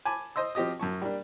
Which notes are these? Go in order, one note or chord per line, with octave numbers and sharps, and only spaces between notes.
G#5 A5 B5 D6
C5 D#5 C6 E6
F3 C4 G4 D#5 D#6
F#2 A5 C#6
G3 A#3 D4